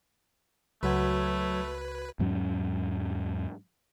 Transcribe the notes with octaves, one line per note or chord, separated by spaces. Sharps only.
C#2 F#3 A3 F#4 B4 G#6
E2 G#2 F#3 C#4